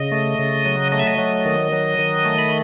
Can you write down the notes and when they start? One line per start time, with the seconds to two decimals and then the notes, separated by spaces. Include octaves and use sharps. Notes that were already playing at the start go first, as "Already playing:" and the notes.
Already playing: C#3 D#5
0.12 A3
0.39 C#3
0.65 F#3
0.92 A3 D#5
0.99 E5
1.07 D#5
1.18 F#3
1.45 D#3
1.72 F#3
1.99 D#3
2.25 A3
2.38 B5